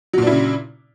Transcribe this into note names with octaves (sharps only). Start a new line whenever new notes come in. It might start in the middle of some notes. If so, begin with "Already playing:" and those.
A#2 C#3 F#3 D4 E4